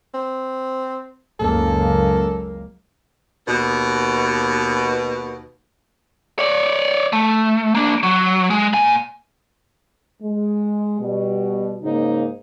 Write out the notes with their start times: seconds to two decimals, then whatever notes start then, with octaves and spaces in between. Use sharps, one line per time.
0.14 C4
1.40 F#1 C#2 A#3 A4
3.48 D#2 B2
6.39 C#5 D5
7.13 A3
7.75 A#3 D4
8.03 F#3
8.50 G#3
8.73 A#2 G#5
10.22 G#3
11.00 B2 G3
11.83 G#2 C#3 A#3 D#4